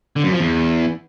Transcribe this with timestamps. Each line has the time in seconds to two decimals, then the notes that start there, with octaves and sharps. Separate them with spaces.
0.16 D3
0.24 F#2
0.32 F3
0.40 E2